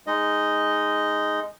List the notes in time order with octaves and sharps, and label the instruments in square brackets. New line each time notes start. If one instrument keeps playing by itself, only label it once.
[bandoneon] G#3 D#4 D#5